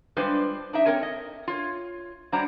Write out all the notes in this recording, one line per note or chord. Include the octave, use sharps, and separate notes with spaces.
G3 G#3 D4 F4 B4 C5
D4 D#4 E5
C4 A4 A#4 C#5
D#5
F4 C#5
F#3 G3 D4 C5 F#5 A#5